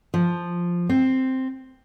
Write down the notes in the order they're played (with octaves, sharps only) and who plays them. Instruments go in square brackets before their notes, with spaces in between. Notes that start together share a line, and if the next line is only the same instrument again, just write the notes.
[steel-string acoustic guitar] F3
C4